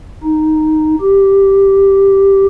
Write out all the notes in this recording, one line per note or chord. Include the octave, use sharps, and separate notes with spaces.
D#4
G4